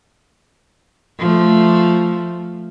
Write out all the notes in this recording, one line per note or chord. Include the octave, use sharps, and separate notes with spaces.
F3 A3